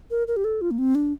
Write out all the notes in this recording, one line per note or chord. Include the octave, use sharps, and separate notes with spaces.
A#4
A#4
G4
A4
F4
A#3
C4
D4